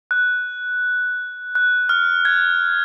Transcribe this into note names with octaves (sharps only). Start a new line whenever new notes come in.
F#6
F#6
F6
G#6